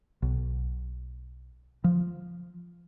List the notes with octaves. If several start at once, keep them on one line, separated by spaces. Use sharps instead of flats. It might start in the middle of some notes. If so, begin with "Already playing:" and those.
B1
F3